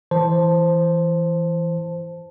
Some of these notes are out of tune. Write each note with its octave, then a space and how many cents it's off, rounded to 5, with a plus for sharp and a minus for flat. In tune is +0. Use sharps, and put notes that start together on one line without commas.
E3 +0 C5 +0 A5 +0